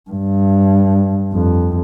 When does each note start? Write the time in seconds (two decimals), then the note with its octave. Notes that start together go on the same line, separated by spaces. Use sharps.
0.10 G2
1.33 F2